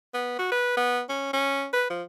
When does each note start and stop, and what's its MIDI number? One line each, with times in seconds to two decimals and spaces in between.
0.14 0.34 59
0.39 0.47 66
0.52 0.75 71
0.77 1.02 59
1.09 1.29 61
1.33 1.68 61
1.73 1.86 71
1.90 2.03 53